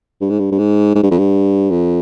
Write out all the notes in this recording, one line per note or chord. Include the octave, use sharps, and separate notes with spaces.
G2
G#2
G2
G2
G#2
G#2
G2
F2
G2
F2